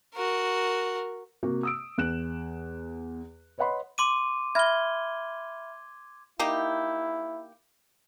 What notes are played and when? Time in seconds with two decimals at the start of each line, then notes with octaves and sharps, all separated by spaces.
0.13 F#4 A#4
1.43 C3 A#3 F#4
1.63 D#6 E6 D7
1.98 E2 F#6 E7
3.58 B4 C#5 D#5 F#5 B5 C6
3.98 C6 D6 D#7
4.55 E5 B5 F6 G#6 G7
6.39 A#3 D#4 E4 G4